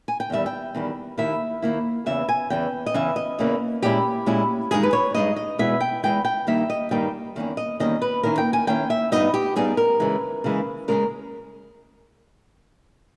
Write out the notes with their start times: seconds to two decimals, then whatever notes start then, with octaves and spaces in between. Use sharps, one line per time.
0.08 G#5
0.20 G5
0.30 E2 D#3 G3 E5
0.46 G5
0.75 E2 D#3 G3
1.18 D#2 D#3 A#3 E4 E5
1.62 D#2 D#3 A#3 E4
2.06 E2 C#3 E3 E5
2.29 G#5
2.50 E2 C#3 E3 G5
2.86 D#5
2.94 E2 C#3 E3 C#4 E5
3.16 D#5
3.39 E2 C#3 E3 A#3 C#4
3.82 A#2 G#3 C#4 E4 G4
4.26 A#2 G#3 C#4 E4
4.71 G2 D#3 G#3 D#4 G#4
4.83 B4
4.93 C#5
5.14 G2 D#3 G#3 D#4 D#5
5.36 D#5
5.58 E2 B2 G#3 B3 E4 E5
5.80 G5
6.03 E2 B2 G#3 B3 E4 G5
6.25 G5
6.47 G2 D#3 G3 A#3 D#4 E5
6.70 D#5
6.91 G2 D#3 G3 A#3 D#4 G5
7.36 E2 D#3 G3 A#3 C#4
7.57 D#5
7.80 E2 D#3 G3 A#3 C#4 D#5
8.02 B4
8.23 D#3 A#3 C#4 E4 A#4
8.38 G5
8.53 G#5
8.67 D#3 A#3 C#4 E4 G5
8.90 E5
9.12 G2 G3 B3 D#4 D#5
9.34 G4
9.56 G2 G3 B3 D#4 G#4
9.77 A#4
10.00 C#3 E3 G#3
10.44 C#3 E3 G#3
10.88 C#3 G#3 C#4 A#4